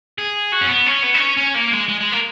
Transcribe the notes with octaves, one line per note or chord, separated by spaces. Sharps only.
G#4
F#4
C#4
B3
C#4
B3
D#4
C#4
C#4
A#3
G#3
G#3
G#3
A#3